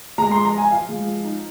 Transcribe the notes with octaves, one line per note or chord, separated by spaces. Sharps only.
G#3 A#5
F3 C6
A#5
F3 G#5
F3 F5
G#3
F3
D#4